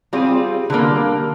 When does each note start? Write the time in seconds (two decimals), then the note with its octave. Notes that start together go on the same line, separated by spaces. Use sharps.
0.13 G3 C4 F4 G#4
0.70 D3 G3 A#3